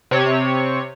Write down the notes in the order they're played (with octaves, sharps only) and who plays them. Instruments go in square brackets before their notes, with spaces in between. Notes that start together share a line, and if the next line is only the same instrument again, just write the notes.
[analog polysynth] C3 C#5